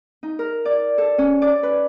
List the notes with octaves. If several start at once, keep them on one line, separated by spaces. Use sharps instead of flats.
D#4
A#4
D5
A4
C#4
D5
B4